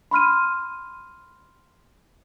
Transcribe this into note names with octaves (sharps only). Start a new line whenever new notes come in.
B5 C6 F6 D#7